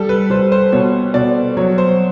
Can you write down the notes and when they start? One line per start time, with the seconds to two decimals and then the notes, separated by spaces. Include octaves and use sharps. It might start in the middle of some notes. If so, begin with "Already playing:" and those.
Already playing: G3 A4
0.09 B4
0.30 G3 C5
0.52 C5
0.72 B2 C#5
1.14 B2 D5
1.57 F#3 C#5
1.78 C5